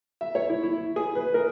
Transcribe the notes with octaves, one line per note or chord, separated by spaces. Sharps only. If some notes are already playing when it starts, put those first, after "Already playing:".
E5
C#5
E4
E4
G#4
B4
A#4